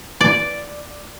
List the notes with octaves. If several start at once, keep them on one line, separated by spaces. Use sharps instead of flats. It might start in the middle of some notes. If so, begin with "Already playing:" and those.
D5